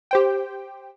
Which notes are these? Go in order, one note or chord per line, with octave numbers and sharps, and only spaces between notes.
G4 C5 G5